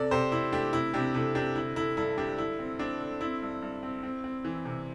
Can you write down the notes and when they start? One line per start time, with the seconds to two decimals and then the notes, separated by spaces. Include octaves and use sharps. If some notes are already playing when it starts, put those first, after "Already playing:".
Already playing: C3 A4 D5
0.11 C3 G4 C5
0.32 C3 E4
0.52 A3 D4 G4
0.73 C3 E4
0.93 C3 D4 G4
1.14 C3 E4 A4
1.35 C3 D4 G4
1.55 D3 E4
1.76 D3 E4 A4
1.97 G2 E4 A4
2.17 G2 D4 G4
2.38 D3 E4
2.59 C4
2.79 C4 D4
3.00 D3
3.21 C4 E4
3.42 G2
3.62 G2
3.83 C4
4.03 C4
4.24 C4
4.45 E3
4.65 C3